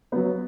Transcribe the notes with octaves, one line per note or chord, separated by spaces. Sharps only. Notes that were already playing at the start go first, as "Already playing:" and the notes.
F#3 B3